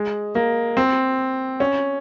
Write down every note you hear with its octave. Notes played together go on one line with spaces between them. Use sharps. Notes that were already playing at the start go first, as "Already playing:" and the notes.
Already playing: G#3
A#3
C4
C#4